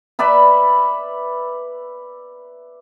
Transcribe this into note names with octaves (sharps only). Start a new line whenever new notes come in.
B4 D5 E5 B5